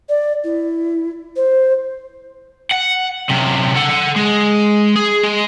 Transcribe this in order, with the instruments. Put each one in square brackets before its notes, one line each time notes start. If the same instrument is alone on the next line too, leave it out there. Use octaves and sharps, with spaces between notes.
[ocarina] D5
E4
C5
[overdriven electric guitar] F#5
F#2 C3
A4 F#5
G#3
G#4
G#3